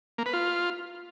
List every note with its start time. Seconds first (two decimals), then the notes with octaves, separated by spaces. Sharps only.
0.18 A#3
0.26 B4
0.33 F4